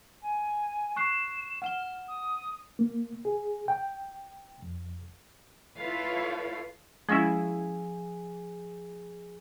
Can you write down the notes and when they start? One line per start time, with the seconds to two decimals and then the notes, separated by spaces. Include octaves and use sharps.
0.22 G#5
0.96 C#6 F#6 C7 E7
1.62 F#5 F6 E7 G7
2.08 D#6
2.79 A#3
3.25 G#4
3.68 G5
4.62 F2
5.77 E4 F4 A4 B4 C#5 F5
7.09 F3 G#3 C#4 E4 G#4 A#6